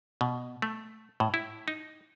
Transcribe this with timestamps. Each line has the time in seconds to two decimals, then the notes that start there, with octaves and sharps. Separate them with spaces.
0.21 B2
0.62 A3
1.20 A2
1.34 E4
1.68 D#4